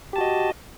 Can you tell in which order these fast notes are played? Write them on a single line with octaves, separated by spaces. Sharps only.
G4 A5 F#4 D#5